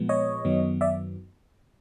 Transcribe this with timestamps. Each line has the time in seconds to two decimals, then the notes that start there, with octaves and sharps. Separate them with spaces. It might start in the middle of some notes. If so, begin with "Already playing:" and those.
Already playing: A#2 F3 G#3 B3
0.09 C#5 D#5
0.44 F#2 D#3 F#3 B3
0.81 D5 E5